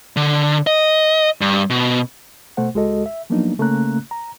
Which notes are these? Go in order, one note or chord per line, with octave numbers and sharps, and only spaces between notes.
D3
D#5
G2
B2
B2 A3 C5 F#5
C#2 G#3 F#4 A4 D#5
E5
F3 F#3 A#3 B3 D4 D#4
C#3 A3 A#3 C#4 A#5 F#6
A#5